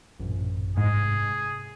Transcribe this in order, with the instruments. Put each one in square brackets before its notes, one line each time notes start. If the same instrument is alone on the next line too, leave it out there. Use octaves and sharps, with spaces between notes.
[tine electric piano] A1 F#2 A#2
[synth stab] G#2 [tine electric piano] C3 [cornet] G#4